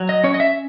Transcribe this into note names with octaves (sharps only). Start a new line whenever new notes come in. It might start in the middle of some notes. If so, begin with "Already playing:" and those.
Already playing: F#3
D#5
C#4 C#5
D#5
E5